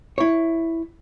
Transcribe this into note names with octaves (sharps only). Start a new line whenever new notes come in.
E4 C#5